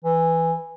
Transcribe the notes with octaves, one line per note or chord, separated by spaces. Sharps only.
E3